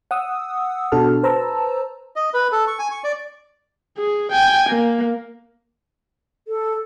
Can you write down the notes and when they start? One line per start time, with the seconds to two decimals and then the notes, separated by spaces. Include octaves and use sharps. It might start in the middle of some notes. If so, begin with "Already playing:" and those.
0.11 F#5 D#6 E6
0.92 B2 D4 F#4 A4 A5 F6
1.23 B4 C5 A5 A#5 E6
2.16 D#5
2.34 B4
2.52 A4
2.67 C#6
2.79 G#5
2.91 C#6
3.04 D5
3.98 G#4
4.32 G5 G#5
4.69 A#3
6.48 A4